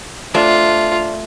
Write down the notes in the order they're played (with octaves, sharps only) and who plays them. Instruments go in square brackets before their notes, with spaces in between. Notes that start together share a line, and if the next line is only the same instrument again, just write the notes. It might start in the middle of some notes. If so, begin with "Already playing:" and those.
[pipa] C3 D4 [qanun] A3 [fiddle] F4